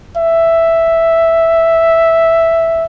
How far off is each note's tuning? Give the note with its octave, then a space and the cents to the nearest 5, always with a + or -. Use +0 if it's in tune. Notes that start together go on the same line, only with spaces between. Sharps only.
E5 +0